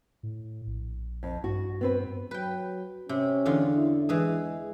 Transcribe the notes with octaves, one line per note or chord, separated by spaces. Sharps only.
A2
A#1
F2
G2 F#4
B3 C4 B4
F#3 B4 G5
C3 C#4
E2 D3 F4
E4
E3 G#3 G#4